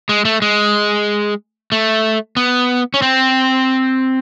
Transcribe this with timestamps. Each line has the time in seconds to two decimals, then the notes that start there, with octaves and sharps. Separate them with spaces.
0.09 G#3
0.25 A3
0.42 G#3
1.72 A3
2.37 B3
2.94 C#4
3.02 C4